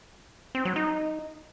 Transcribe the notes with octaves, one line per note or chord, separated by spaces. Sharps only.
C4
F#3
D#4